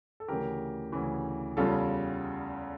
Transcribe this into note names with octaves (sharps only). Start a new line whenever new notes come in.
A4
D2 C#3 E3 G4 A#4
D2 C#3 E3
E2 C#3 G3 F4 A4